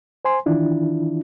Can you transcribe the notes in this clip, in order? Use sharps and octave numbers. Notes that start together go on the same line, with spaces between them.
C5 G#5 C6
D#3 E3 D4 E4 F4